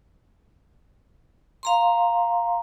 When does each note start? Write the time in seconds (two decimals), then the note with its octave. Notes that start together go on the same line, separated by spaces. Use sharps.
1.63 F5 A#5 C6